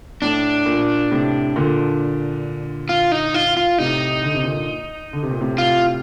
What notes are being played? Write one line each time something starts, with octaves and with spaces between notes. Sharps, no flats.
A2 D4
A#2
A2 C3
A#2 D3
F4
D#4
F4
F4
A2 C3 D#4
D3
C3
A#2 D3
D3
C3
A#2
A2 C3
F4